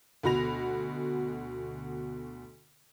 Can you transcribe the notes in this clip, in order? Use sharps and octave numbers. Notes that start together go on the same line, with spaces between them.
D2 B2 F#4 B5 A#6 F7